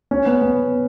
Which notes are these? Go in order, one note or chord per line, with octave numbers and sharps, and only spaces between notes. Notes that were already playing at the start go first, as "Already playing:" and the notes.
C#4
B3
B3